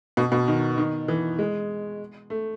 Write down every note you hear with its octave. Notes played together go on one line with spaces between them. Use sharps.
B2
B2
D#3
D#3
E3
G#3
A3